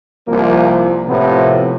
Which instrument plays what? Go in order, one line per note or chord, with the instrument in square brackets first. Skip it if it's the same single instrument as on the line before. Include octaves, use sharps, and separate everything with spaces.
[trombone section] C2 F3 A#3
A2 C3 F3 B3